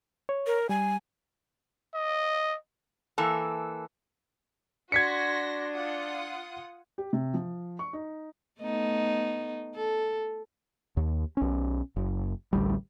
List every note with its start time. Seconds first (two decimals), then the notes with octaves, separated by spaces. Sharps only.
0.29 C#5
0.47 A#4
0.69 G3 G#5
1.94 D#5
3.18 E3 A#3 A4
4.92 D4 F#4 C6 G#6 A#6 B6 C#7
5.73 F4 F#5 D#6
6.98 G4
7.13 C3
7.34 F3
7.79 C#6
7.93 D#4
8.61 A3 B3 D#4
9.76 A4
10.97 D#2
11.37 B1 C#4
11.96 F#1
12.53 A1 D2 G3